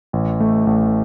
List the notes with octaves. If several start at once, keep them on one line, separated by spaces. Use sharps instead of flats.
A1
A3
A1